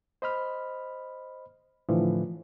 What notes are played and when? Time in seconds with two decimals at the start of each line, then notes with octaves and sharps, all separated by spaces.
0.22 C5 D#5 B5 F6
1.89 A2 D3 E3 F3